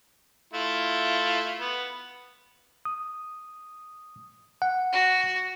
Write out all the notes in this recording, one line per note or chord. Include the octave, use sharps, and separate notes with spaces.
A3 E4 F4
B3
D#6
F#5
F#4